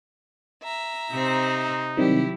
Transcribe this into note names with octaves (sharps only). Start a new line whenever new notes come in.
E5 A#5
C3 C4 D#4
C3 D#3 F#3 G3 E4 G4